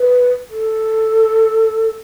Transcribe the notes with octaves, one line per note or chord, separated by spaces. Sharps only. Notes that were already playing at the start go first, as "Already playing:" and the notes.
Already playing: B4
A4